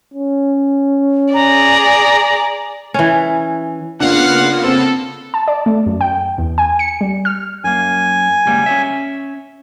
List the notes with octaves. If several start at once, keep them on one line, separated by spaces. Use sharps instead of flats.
C#4
G#4 D5 A#5
E3 C#4
C#3 A#3 B3 D4 F4 F5 F#5
C4 A4
A5
D5
A3
F#2
G5
E2
G#5
C#7
G3
F6
F#2 A#3 G#5
C#2 G3 A#3
C#4 C#5 E5